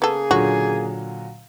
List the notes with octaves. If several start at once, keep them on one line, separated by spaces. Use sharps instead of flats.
C#3 A#3 B3 G#4 A4
A#2 D3 F#3 F#4